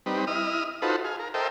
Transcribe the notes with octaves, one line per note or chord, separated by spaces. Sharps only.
G3 C4 D#4 B4
E4 D#5 D#6 F6
D#4 F4 F#4 A4 B4 C5
G#4 F5
A#4
A4 A#4 C5 D#5 E5 G5